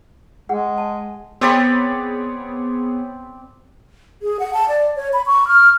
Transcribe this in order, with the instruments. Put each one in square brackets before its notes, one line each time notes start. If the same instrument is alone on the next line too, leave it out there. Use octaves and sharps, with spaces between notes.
[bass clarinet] G#3 [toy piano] G#4 F#5
[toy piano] A5
[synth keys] B3 G#4 C#5 [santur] C4 D5 B5
[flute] G#4
F#5
A5
D5
C#5
B5
C#6
F6